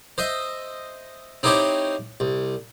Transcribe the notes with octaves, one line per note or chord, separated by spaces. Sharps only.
C5 D#5 E5
C4 D#4 E4 G4 C5 C#5
C2